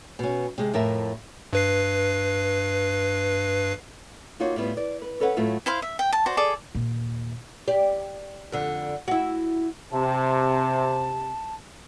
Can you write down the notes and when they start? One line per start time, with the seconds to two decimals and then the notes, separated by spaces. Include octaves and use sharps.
0.19 B2 C#4
0.58 C3 G#3
0.74 F2 A2 A#4 E5
1.53 G2 B4 C7
4.40 A#3 D#4 F4 F#4 C#5
4.56 A2 G3 B3 F4
4.77 D5
5.02 B4
5.20 C#4 A4 B4 C#5 E5 F#5
5.37 A2 F#3 A3 F4
5.66 E4 C5 F5
5.82 E5
5.99 G5
6.13 A5
6.26 F#4 C5 D5
6.37 G#4 A4 D5
6.75 D#2 A#2
7.68 G4 D5
8.52 F2 D3
9.08 E4 F#4
9.91 C3 A5